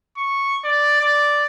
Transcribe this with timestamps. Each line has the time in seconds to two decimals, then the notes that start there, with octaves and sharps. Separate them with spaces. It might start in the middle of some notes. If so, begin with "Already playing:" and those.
0.17 C#6
0.65 D5
1.01 D5